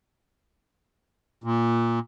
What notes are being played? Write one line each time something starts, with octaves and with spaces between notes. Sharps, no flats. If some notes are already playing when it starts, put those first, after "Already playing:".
A#2